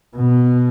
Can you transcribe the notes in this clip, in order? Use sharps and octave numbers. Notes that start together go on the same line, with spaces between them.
B2